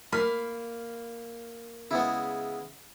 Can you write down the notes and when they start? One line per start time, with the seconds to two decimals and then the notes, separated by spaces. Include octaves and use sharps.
0.12 A#3 B5 F6 B6
1.91 C#3 G#3 B3 E4